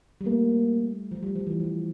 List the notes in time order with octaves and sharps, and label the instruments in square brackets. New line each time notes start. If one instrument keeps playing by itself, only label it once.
[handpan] G3
[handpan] A3 [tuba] A#3
[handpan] F3
G3
F3
E3
F3